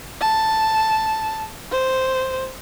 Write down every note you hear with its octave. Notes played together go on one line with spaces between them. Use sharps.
A5
C5